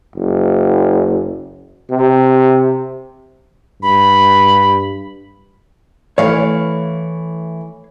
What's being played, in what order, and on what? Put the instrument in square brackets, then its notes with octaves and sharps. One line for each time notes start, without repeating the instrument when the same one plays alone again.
[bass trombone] F#1
C3
[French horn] G2 [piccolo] B5
[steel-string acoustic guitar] E3 A3 [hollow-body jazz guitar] C#5 F5